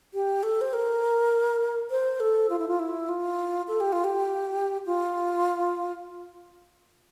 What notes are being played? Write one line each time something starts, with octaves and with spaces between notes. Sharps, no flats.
G4
A4
C5
A#4
C5
A4
F4
E4
F4
E4
F4
A4
G4
F4
G4
F4